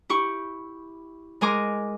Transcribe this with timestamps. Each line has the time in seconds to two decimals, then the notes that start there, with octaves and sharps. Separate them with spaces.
0.09 E4 G4 C#6
1.41 G#3 A#4 G#5 A#5 C6 D6